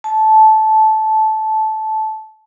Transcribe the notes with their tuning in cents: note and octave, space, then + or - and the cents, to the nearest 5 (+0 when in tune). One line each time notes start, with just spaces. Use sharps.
A5 -15